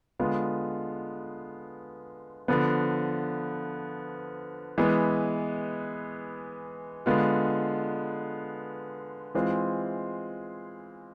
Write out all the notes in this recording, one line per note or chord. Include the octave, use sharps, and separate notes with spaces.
D3 G#3 B3 F4
D3 F3 B3
E3 G#3 B3
D3 G#3 B3 F4
E3 G#3 C4 F4